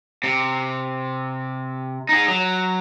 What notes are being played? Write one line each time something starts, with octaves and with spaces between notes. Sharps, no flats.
C3
D#4 G#4
F#3